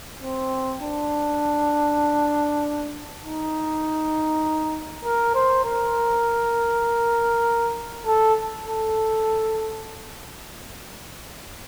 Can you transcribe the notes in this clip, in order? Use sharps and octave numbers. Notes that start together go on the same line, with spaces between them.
C4
D4
D#4
A#4
C5
A#4
A4
A4